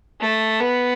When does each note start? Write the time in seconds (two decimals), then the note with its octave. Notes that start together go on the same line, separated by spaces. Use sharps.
0.21 A3
0.61 B3